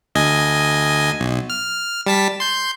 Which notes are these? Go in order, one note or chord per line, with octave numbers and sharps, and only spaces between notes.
D2 D#5 G#5
B1
F6
G3 A5 B6
C6 G6